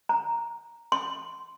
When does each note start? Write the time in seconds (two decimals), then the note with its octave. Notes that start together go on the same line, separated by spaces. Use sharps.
0.09 A#5
0.92 C6